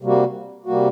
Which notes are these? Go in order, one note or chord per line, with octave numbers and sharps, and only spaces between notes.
C3 G3 A#3 F#4
C3 G3 A#3 F#4